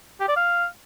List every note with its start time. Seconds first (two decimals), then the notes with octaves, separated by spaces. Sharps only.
0.20 G4
0.28 D5
0.36 F5